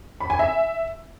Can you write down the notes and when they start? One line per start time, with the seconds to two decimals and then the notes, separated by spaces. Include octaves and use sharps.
0.20 B5
0.30 G#5
0.39 E5